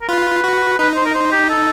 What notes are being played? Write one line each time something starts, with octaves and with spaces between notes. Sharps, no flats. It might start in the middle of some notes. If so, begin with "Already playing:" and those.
A#4
F4 B4
F#4
D#4 B4
C5
A#4
C5
G4
A4